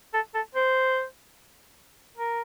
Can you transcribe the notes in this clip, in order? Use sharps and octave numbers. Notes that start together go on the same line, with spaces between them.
A4
A4
C5
A#4